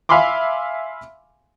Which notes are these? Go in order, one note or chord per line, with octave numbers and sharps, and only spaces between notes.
E5 F5 G#5 B5 C6 D6